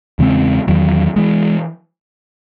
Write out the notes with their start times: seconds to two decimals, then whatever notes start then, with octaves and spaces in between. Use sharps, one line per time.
0.19 E2 C#3 G#3 C4
0.67 E2 D#3 F#3
1.16 E3 G#3